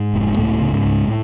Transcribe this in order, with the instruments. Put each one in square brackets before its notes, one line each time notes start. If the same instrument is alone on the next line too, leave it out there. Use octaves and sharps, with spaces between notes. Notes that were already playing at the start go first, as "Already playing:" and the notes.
Already playing: [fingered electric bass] G#2 G#3
F1
C#2 A2 A3
C#3
G#2 G#3
C#2
A2